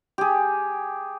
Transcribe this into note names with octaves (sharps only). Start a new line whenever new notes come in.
G4 G#4